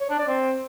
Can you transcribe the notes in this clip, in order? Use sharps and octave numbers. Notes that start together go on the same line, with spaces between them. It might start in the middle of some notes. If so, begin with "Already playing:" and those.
C#5
D4
D5
C4